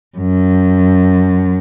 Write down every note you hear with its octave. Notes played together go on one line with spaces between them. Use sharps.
F#2